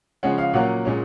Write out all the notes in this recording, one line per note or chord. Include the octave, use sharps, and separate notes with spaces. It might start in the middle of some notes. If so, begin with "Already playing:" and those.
C#3 F3 G#3 C#4 F#5
F5
A#2 F#3 A#3 C#4 F#5
A#2 G#3 C#4